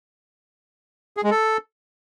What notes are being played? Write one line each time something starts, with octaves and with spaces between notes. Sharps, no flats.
G#4
G#3
A4